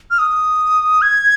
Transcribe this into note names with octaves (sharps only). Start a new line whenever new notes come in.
F6
D#6
G#6